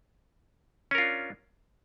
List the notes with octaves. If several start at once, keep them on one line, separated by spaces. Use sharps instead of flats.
C#4 D4 F4 A#4